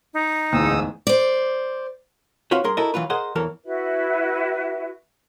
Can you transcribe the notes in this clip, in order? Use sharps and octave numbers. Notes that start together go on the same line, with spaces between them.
D#4
D1 E2 G#2 D#6 E6
C5 D5
C4 F4 F#4 B4 C#5
G3 G#4 A#4 C6
E4 F#4 A4 A#4 D#5
E3 F#3 F4 B4
G#4 A#4 C5 D#5 F#5
B1 E2 E3 F#3 A4 A#4
E4 F#4 B4 E5